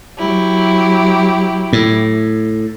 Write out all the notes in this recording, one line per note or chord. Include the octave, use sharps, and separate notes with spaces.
F#3 E4 G4
A2